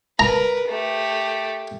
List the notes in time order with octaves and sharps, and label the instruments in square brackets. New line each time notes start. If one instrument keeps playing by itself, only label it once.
[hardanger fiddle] A#4 B4 [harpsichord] A#5
[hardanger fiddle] A3 G4